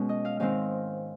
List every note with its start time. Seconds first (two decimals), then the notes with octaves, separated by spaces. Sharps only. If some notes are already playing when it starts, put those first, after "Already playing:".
Already playing: B2 G#3 C#4
0.09 D#5
0.25 F5
0.40 G#2 D#3 G#3 C4 D#4 F5